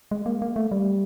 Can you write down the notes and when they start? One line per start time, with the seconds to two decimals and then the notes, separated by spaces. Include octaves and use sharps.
0.11 G#3
0.26 A#3
0.42 A#3
0.56 A3
0.72 G3